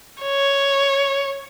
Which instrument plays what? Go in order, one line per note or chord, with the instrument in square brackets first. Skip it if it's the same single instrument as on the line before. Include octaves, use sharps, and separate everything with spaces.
[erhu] C#5